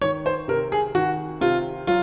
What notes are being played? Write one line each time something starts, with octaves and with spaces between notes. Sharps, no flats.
D#3 C#5
C5
C3 A#4
G#4
D#3 F#4
C3 F4
F#3 F4